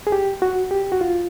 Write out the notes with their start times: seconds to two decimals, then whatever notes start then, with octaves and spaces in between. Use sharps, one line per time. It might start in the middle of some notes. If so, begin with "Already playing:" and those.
0.07 G#4
0.12 G4
0.42 F#4
0.71 G4
0.92 F#4
1.01 F4